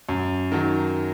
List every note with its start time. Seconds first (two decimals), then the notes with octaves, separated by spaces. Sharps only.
0.09 F#2
0.52 D#3 F#3